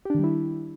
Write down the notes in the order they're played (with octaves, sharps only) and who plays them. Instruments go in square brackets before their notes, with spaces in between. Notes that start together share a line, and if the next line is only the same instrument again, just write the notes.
[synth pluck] G4
D4
D#3
G3
E4